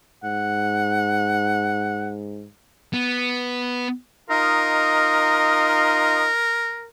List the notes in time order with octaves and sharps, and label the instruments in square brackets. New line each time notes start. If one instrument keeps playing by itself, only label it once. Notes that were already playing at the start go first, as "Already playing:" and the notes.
[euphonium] G#2 [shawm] F#5
[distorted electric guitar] B3
[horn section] D#4 F4 D#5 [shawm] A#4